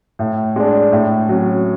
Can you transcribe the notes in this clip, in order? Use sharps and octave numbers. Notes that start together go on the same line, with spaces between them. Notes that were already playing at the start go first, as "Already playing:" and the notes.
A2
G#3 D4
A2
F#3 C#4